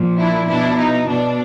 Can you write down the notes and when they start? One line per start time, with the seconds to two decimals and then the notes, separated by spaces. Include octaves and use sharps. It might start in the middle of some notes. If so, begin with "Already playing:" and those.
Already playing: A#2 F3
0.18 D4 E4
0.48 B2 D4 E4
0.78 D#4
1.08 B2 D4